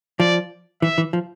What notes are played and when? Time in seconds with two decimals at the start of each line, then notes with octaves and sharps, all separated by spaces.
0.20 F3 D5
0.82 E3 E5
0.98 E3
1.13 F3